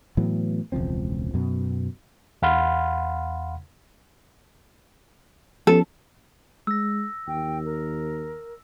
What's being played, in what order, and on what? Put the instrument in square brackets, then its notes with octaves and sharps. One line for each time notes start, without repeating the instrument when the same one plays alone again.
[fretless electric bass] A2 E3 F#3 B3
E1 C#2 F3 C4
F#2 B2
[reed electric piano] E2 F5 F#5 B5 C6 F6
[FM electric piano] F3 B3 C#4 [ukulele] A4
[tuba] G#3 [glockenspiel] E6 A#6
[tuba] D#2 [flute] G5
[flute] A#4